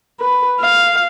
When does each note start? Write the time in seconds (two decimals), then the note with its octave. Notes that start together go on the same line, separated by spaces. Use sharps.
0.21 B4
0.60 F5